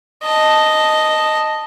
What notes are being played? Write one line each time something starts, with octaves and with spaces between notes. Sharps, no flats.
D#5 A5